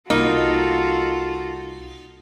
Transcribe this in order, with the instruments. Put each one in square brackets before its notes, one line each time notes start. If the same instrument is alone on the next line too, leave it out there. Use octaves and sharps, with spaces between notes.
[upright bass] C2 [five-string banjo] A#3 [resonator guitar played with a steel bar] D#4 [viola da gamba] F4 F#4 A4